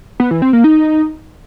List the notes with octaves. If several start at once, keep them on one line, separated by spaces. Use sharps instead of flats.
B3
E3
C4
A#3
D#4